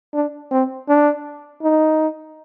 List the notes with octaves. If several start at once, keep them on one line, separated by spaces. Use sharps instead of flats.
D4
C4
D4
D#4